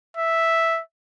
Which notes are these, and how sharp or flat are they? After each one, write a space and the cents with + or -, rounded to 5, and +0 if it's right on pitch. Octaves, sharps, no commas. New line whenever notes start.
E5 +0